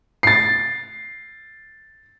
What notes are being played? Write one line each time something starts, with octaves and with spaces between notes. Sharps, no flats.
A6 C7